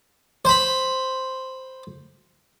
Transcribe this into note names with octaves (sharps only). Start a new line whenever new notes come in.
C5 B5